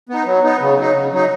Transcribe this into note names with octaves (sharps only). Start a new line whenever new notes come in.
B3 D#4
F#3
B3 D#4
C#3
F#3 D#4
C#3
F#3 D#4